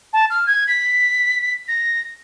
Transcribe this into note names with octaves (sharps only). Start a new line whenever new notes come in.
A5
F6
G#6
B6
A#6